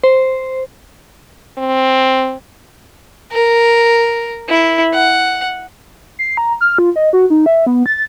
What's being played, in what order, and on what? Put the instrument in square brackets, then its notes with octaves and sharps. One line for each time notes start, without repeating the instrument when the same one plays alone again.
[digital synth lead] C5
[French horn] C4
[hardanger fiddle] A#4
E4
F#5
[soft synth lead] C7
A#5
F6
F4
D#5
F#4
D#4
E5
B3
A6